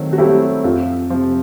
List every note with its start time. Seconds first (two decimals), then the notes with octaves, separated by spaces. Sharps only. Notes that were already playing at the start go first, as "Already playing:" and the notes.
Already playing: D#3 F#3 A3 C4
0.13 F#4
0.18 F#3 G3 A3 C4 E4 G4
0.64 F2 F3 F4
1.10 C3 F3